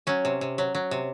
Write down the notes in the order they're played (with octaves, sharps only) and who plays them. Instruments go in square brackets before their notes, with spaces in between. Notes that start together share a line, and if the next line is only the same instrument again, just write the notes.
[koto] F#3 C#4
C3
C3
F#3
F#3
C3